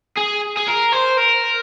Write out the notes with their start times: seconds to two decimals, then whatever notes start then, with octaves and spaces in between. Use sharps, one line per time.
0.17 G#4
0.57 G#4
0.68 A#4
0.93 C5
1.18 A#4